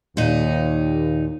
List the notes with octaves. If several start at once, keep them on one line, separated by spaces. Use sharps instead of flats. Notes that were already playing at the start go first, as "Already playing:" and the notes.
D#2 A#2 D#4